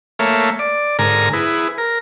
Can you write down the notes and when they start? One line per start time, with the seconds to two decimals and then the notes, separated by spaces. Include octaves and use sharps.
0.19 A3 A#3 C#5 E5 F5
0.59 D5
0.99 G#2 D3 A#4 G#5 A#5
1.33 E4 G#4 B4
1.78 A#4